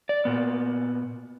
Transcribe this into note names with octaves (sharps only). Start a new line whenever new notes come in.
D5
A#2 B3